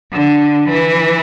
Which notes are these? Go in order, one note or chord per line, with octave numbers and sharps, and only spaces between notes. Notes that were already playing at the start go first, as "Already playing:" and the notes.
D3
E3